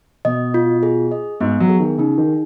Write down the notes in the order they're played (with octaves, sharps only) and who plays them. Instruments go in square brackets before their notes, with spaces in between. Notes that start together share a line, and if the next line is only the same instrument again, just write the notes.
[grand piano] B2 [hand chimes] D#5
[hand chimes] F4
G#4
D#5
[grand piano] G#2 [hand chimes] B3
[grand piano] F#3
[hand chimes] G#4
[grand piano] D#3
[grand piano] C#3 [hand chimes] D#4
[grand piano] D#3
[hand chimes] G#4